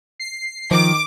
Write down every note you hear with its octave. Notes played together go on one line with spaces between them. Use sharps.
C7
D#3 F3 D6